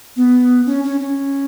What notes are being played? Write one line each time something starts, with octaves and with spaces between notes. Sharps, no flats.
B3
C#4
C#4
C#4